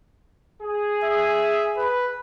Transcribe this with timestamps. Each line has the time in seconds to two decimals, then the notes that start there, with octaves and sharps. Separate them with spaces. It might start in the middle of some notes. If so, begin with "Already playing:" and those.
0.62 G#4
1.03 E5
1.77 B4